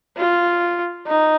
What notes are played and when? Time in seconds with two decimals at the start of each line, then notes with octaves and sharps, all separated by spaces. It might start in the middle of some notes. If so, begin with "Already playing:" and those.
0.17 F4
1.07 D#4